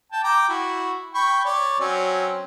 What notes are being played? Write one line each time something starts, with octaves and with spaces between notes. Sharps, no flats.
G5 A5
G5 A#5 D6
E4 F#4
G5 B5 C#6
C#5 D5
F#3 C4 C#4